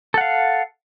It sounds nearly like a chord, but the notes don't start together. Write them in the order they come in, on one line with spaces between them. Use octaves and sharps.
A4 F#5 F5